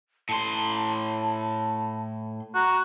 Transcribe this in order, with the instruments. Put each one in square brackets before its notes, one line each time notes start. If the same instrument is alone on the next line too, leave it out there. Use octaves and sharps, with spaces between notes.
[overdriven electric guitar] A2 C6 [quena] A5
[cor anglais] F#4 [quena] A#5